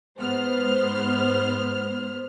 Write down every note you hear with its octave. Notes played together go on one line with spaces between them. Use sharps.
G#2 B3 C5 F6